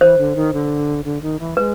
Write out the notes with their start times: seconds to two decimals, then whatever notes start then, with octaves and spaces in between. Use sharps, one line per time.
0.01 E3 C5
0.18 D3
0.36 D#3
0.53 D3
1.05 D3
1.22 D#3
1.40 E3
1.57 G#3 B4